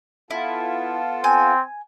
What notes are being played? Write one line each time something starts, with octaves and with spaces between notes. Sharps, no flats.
B3 E4 F4 A4
C4 G#5